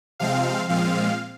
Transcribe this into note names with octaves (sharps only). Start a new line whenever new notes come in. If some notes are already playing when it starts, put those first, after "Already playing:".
C3 F3 G#3 C4 F5
A#2 F3 G#3 C4 F5